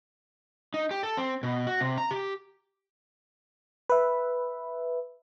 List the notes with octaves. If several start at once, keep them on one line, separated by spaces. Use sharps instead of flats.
D#4
G4
A4
C4
B2
F#4
C3
A#5
G4
B4 E5